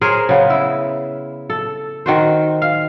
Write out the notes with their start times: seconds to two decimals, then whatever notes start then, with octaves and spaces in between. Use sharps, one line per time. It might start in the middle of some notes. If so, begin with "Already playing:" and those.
0.01 G#4 A#4 C5 C#5
0.29 C#3 B3
0.50 E4
1.50 A4
2.06 D#3 F#4 C5
2.62 F5